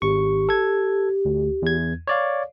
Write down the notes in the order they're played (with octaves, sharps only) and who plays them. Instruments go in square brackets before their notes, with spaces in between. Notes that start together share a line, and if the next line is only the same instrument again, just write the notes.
[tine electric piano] G#1 C#6 [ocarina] G4
[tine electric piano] A4 G#6
D2
E2 G#6
C#5 D5 F5